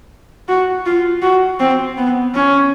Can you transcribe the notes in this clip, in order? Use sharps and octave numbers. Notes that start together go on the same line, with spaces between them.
F#4
F4
F#4
C4
B3
C#4